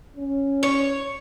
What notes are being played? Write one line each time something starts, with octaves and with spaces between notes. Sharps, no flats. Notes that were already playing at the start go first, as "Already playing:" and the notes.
C#4
C#5